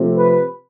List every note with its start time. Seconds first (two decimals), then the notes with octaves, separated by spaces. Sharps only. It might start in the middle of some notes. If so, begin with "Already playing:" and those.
Already playing: C3 F3 A3
0.16 B4